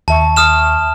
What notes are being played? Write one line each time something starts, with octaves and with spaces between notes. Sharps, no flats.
D#2 E5 A5 C#6
D#6 F6 E7